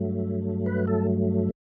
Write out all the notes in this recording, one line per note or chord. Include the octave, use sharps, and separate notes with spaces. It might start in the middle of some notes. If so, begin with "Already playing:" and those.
Already playing: G2 F#3 A3
B4
A4